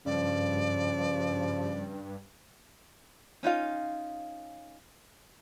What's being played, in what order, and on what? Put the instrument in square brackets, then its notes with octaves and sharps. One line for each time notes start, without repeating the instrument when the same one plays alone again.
[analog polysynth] G2 [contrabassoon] C#3 [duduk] F3 [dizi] D5
[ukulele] C#4 D#4 F4 F5